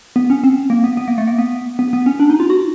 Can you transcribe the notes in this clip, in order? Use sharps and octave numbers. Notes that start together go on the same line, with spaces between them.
B3
C#4
C4
A#3
B3
B3
A#3
A3
A#3
B3
B3
B3
C#4
D4
D#4
F4
F#4